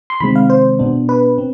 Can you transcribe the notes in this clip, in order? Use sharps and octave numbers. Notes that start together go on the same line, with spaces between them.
C6
C3 D#3 G#3 C4 B5
F5
C5
B2 B3 D4
B4
C4